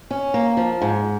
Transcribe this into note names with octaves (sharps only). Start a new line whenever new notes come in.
C#4
A#3
F3
G#2